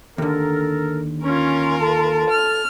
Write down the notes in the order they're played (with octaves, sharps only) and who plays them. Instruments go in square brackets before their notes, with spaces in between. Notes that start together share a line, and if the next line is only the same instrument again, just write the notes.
[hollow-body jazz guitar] D#2 D3 [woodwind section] A4 A#4
[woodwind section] C#4 [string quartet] F4 A#4
[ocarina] A4 [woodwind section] A5
[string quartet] F6